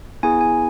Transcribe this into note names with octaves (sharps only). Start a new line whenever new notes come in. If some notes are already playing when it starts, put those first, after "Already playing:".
B3 E4 G#4 G#5
G#5